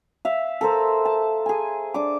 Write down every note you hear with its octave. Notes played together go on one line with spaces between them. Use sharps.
E5 F5
A4 A#4 C5
A5
G#4 G#5
D4 D6